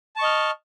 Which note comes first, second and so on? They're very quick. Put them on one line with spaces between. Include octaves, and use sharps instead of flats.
A5 C#6 D#5 F6